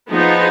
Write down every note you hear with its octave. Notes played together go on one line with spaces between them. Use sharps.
F3 B3 D#4 G#4